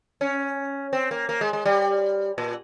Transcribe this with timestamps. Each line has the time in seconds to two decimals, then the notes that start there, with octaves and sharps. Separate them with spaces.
0.21 C#4
0.93 C4
1.11 A#3
1.29 A#3
1.41 G#3
1.53 G#3
1.65 G3
2.38 A#2